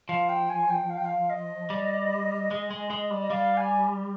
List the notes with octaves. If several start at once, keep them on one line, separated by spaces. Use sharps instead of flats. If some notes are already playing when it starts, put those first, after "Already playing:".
F3 F5
G5
G#5
G5
F5
G5
F5
D#5
G3
G#3
G#3
G#3
G3
D#5
G3 F5
G#5